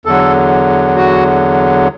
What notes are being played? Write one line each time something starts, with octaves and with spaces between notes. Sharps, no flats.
E2 D3 F#3 A4
F#4